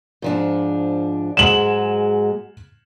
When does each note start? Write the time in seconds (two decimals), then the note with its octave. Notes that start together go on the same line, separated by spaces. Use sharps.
0.22 G#2 F3 D4
1.37 G#2 F#3 G#3 E7 F#7